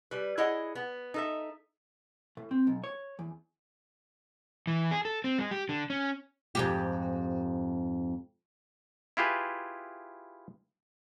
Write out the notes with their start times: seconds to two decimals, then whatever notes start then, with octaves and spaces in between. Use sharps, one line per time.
0.11 G3 B4
0.38 E4 G#4 C#5 D#5 F#5
0.75 B3
1.14 D#4 A4 E5
2.37 A2
2.51 C4
2.67 B1
2.84 C#5
3.19 E2
4.67 E3
4.91 G#4
5.05 A4
5.24 C4
5.38 G#3
5.51 G4
5.69 D3
5.90 C#4
6.55 F2 G#2 G4
9.17 E4 F4 G4 G#4 B4